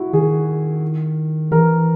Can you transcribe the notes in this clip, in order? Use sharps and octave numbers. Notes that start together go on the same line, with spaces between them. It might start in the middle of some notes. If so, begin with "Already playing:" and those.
Already playing: E4 F#4
D#3 G#4
E3 A#4